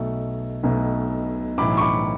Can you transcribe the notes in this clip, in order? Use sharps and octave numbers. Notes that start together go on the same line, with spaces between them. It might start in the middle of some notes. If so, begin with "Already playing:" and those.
Already playing: B1 B2 A3
B1 B2 A3
B1 A2 E3 B5 D6
C#6
B5 D6